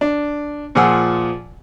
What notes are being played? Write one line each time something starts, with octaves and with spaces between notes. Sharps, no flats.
D4
A#2 F3 G#4 F#5 G#5 E6